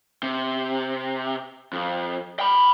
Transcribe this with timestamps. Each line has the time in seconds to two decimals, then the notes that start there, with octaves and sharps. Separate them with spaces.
0.23 C3
1.73 F2
2.40 G5 B5